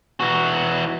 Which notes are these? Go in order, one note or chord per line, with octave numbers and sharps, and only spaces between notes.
E3 F#4